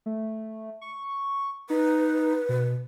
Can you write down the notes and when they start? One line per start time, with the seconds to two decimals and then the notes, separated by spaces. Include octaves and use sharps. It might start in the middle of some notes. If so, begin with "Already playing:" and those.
0.06 A3
0.81 C#6
1.70 D#4 B4
2.49 B2